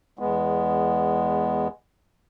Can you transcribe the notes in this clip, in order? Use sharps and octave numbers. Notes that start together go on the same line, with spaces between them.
E2 G#3 B3